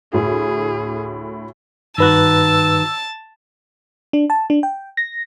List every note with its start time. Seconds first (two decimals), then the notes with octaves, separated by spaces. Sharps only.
0.13 D2 A2 G#4
1.98 G2 D#3 F#4 B4 A5 E6 F#6
4.13 D4
4.30 A5
4.50 D4
4.63 G5
4.97 A#6